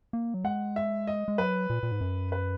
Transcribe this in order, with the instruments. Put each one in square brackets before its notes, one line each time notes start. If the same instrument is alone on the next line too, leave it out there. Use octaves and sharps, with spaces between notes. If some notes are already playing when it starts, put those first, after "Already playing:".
[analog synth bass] A#3
F#3
[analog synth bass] G#3 [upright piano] F#5
[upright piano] E5
D#5
[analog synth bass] G#3
[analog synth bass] F#3 [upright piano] B4
[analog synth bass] A#2
A#2
G#2
F#2
[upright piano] B4